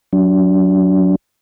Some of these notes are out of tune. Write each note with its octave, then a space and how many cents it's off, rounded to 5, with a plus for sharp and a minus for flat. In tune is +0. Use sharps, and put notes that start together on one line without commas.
F#3 +0 D4 -40